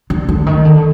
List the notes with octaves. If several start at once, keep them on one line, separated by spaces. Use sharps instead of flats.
D3
D3
D#3
D3